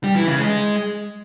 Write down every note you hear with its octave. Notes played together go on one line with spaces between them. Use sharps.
G3
E3
C#3
G#3